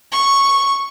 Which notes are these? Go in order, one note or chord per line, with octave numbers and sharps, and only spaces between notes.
C#6